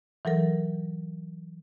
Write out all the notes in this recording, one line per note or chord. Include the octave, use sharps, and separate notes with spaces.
E3 F#3 A4 A#4